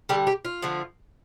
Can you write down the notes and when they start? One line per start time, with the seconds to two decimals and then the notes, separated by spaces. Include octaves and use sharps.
0.09 D3 G3 G4
0.27 G4
0.45 F4
0.62 D3 F3 A3